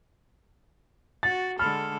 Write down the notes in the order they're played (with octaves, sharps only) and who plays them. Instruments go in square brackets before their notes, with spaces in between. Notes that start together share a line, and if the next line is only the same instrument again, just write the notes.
[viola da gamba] F#4 [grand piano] A6
[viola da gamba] D3 G#3 A4 [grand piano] B5 F6